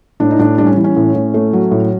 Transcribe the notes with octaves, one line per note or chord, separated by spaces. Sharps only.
A2 D4
D#4
A2 D4
G3 D4
C#4
E3
C#4
A2
A2
A3
F#3
A2